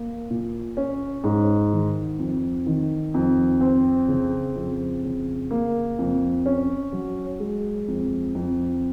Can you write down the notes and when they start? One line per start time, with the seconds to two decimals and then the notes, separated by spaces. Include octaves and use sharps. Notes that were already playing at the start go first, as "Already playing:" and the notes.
Already playing: A#3
0.30 A#2
0.77 C#4
1.24 G#2
1.72 D#3
2.19 F2
2.66 D#3
3.14 F2
3.61 C4
4.08 C#3
4.55 F2
5.03 C#3
5.51 A#3
5.98 F2
6.46 C#4
6.92 F#3
7.40 G#3
7.88 F2
8.35 F2